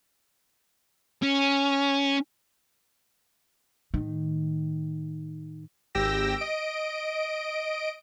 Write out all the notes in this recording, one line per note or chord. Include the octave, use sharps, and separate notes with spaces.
C#4
A2 D#3
G#1 G4 G5 E6 A#6
D#5 D7